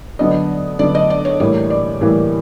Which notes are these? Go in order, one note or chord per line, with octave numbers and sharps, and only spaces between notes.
D3 F#3 B3 D4 D#5
D3 F#3 B3 D4 D5
D#5
D5
C#5
A2 E3 G3 A#3 C#5
D5
A2 E3 G3 A#3